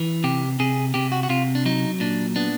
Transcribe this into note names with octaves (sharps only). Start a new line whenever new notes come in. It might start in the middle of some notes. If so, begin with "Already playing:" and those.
Already playing: E3
C3 G4
C3 G#4
C3 G4
F#4
F#4
C3 F4
D4
F#3 D#4
A#2 D4
B3 D4